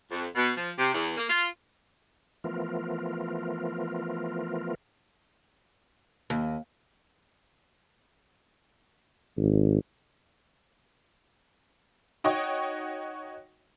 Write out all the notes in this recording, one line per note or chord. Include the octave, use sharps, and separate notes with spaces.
F2
B2
F3
C3
E2
A#3
F4
E3 F3 A3 B3 F4 A#4
D#2
G#1
D#4 F#4 C#5 D#5 G5 C#6